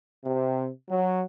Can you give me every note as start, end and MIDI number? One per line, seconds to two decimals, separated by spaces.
0.25 0.67 48
0.89 1.21 54